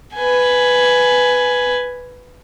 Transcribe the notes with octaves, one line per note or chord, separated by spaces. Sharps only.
B4 G#5